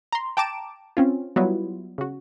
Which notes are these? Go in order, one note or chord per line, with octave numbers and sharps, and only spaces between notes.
A#5 C6
G5 A5 A#5 D6 D7 E7
C4 C#4 F4
F#3 G3 B3 E4 F4
C#3 F#4